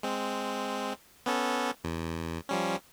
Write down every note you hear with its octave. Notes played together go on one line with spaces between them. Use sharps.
G#3 C4
B3 C#4 A4
E2
F3 G3 C#4